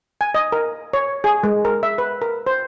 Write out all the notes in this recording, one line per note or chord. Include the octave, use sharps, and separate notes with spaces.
G#5
D#5
A#4
C#5
G#4
G#3
A#4
E5
B4
A#4
C5